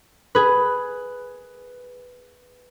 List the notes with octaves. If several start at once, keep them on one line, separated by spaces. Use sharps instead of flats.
G#4 B4